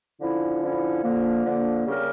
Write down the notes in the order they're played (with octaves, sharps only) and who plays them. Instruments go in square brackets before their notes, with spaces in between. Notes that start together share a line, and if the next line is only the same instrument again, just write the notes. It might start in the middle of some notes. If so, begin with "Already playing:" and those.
[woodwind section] D3 F3 C#4 E4
D3 F3 C#4 E4
D3 F3 A#3
D3 F3 A#3
C#3 G3 C#4 G4 A#4